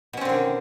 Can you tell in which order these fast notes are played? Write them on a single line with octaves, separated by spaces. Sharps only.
B2 C#4 C4 D3 D#3